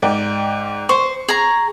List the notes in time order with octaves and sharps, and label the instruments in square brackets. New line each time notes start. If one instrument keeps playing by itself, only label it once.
[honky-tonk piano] G#2 D5 G5
[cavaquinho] C5 [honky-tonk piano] C#6
[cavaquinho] G#4 A#5